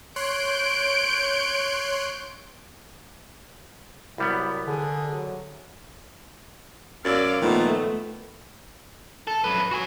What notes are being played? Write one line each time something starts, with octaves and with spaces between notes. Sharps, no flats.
C#5 C6 F#6 G6 D7
C2 F#3 G3 B3 E4
D3 G#4
F#3
F#2 D5 F5 E6 G#6 A6
A#2 D#3 F3 A3 B3
A4
F#2 B4
F#4 G#5